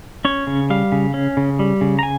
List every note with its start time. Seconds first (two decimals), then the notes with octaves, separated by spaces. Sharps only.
0.25 C#4 C#5
0.47 C#3
0.70 G3 F5
0.92 C#3
1.14 C#4
1.37 C#3
1.59 G3
1.81 C#3
1.99 A#5
2.03 G#5